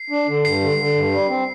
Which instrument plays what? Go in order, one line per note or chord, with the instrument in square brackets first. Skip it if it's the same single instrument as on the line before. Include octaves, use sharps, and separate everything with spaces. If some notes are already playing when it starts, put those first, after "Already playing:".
Already playing: [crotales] C7
[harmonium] D4
D3
[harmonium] G2 [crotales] C7
[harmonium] D3
D3
G2
G3
C4